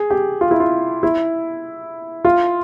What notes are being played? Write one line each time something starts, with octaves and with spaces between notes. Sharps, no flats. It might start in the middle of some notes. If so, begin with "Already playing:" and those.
Already playing: G#4
G4
F4
E4
F4
E4
F4